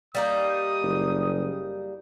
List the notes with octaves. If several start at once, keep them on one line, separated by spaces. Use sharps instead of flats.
G3 A#3 D#4 D#6
F#1